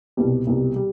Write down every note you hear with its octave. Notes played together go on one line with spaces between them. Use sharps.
C2 B2 G3
C2 B2 G3
G3